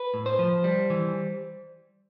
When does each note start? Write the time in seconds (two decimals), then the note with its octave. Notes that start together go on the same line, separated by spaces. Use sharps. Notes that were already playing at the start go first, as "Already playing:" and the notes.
Already playing: B4
0.14 A2
0.26 C5
0.39 F3
0.64 G3
0.90 E3